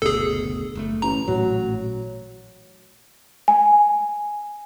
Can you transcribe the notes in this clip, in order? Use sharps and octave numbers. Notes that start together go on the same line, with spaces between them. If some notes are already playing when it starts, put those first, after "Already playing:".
F#1 D2 B2 G#4 A4
F#1 A3
A1 A#5
A1 A#2 F#3 A3
G#5